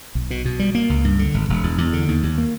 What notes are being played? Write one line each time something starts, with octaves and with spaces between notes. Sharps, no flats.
B1
B2
B2
G3
A#3
C#2
G2
D3
G#1
E1
E2
E2
D3
D#2
D#2
A#3